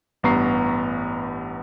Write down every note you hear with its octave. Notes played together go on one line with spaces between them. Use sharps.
A1 G2 B3 A#5 C#6 C7